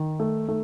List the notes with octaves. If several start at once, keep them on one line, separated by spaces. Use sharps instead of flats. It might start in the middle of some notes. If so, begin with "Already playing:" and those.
Already playing: D#3
A3
A3